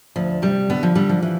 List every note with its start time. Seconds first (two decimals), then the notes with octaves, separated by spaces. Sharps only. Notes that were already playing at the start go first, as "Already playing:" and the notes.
0.16 D2 F3
0.42 C3 G3
0.70 D3 B3
0.83 F3
0.95 D3 G3
1.09 F3
1.23 E3